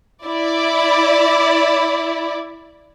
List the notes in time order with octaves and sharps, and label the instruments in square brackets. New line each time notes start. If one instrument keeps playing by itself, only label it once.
[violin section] E4 D5